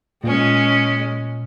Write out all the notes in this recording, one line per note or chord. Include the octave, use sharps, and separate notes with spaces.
A#2 G#3 C#4